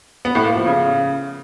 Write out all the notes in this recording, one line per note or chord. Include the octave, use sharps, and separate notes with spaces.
B3
A2
A#3
F3
C#3